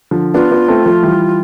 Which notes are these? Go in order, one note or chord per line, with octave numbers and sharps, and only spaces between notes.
D3 F3
B3 D4 F4
B3 D4
A3 C4
F3 A3
E3 G3